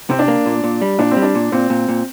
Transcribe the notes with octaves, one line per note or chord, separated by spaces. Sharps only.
C3 C4
D4
A#3
A#2
A#2
G3
A#2 D4
C4
G3
D4
A#2
A#2 C4
A#2
A#2